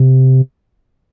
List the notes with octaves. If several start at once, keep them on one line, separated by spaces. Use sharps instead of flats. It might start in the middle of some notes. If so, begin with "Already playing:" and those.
Already playing: C3